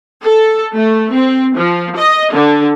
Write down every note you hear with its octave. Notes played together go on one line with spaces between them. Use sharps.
A4
A3
C4
F3
D#5
D3